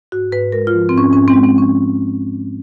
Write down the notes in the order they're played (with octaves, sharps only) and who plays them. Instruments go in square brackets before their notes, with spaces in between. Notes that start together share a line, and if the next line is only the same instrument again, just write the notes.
[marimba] G#2 F#4
G#2 B4
G#3 A#4
F4
F3
C4
G#2 C#4
G#2 C#4
C4
G#3
C4
F3 C#4